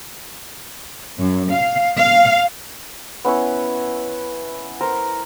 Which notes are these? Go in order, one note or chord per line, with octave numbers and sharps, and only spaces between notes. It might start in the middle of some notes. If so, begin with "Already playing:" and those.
F#2
F5
F5
B3 C#4 E4 C#5
A#4 C5 A#5